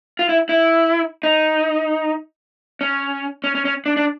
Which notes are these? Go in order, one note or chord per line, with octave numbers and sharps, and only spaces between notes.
F4
E4
E4
D#4
C#4
C#4
C#4
C#4
D4
D4